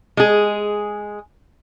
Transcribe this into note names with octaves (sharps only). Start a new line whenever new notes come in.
G#3 G#4